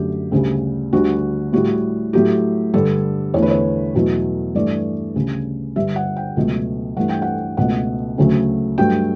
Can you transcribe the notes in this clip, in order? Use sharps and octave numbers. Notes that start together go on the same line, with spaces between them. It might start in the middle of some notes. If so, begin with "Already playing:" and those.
Already playing: F#2 D3 F#3 A3 G4
D2 C#3 G3
D2 D3 G3 F#4
A2 G3 F#4
A2 F#3 A3 G4
G2 D3 G3 A4
E2 D3 A3 C#5
B4
C#5
E2 B2 F#3 A3
G2 E3 A3 D5
D2 C#3 G3
G2 D3 G3 E5
F#5
G5
C#2 B2 F#3 A3
G2 E3 A3 F#5
G5
F#5
C#2 B2 A3 F#5
D2 C#3 F#3 A3
G2 F#3 A3 G5